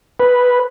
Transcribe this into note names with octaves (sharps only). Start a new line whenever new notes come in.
B4